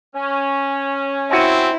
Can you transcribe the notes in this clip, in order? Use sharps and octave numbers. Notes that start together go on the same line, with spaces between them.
C#4
C4 E4 F#4 G#5